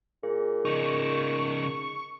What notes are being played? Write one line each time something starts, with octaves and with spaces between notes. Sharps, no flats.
A#2 G#4
C#3 D#4 C#6